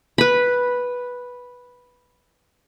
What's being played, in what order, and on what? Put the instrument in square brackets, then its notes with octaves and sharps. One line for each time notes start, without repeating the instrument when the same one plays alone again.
[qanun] B4 B5